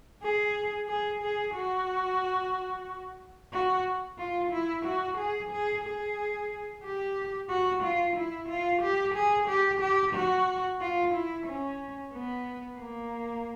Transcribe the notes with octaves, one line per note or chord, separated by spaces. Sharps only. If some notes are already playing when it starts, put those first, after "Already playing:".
G#4
G#4
G#4
F#4
F#4
F4
E4
F#4
G#4
G#4
G#4
G4
F#4
F4
E4
F4
G4
G#4
G4
G4
F#4
F4
E4
C#4
B3
A#3